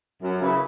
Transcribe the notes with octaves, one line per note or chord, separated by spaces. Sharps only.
F#2
C#3 E3